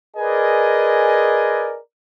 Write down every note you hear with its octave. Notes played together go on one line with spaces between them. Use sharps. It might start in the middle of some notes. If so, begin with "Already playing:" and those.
G#4 A#4 B4 D5 D#5 G#5